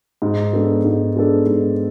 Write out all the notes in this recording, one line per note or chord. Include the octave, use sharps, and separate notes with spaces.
G#2
G#3 B3 D4 A4
G#2
G#3 B3 D4 A4
G#2